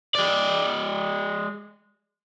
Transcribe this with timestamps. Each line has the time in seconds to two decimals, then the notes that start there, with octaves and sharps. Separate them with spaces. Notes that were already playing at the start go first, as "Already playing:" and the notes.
0.15 G#3 D5